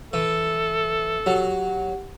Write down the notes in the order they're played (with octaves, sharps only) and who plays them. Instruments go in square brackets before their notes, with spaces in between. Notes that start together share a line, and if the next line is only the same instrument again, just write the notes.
[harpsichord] E3 [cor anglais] A4
[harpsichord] F#3 [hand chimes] G4 F#5